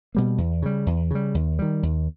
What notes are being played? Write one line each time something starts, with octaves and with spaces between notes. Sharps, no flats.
B2 G3 A#3
E2
C#3 G3
E2
C#3 G3
D#2
D#3 G3
D#2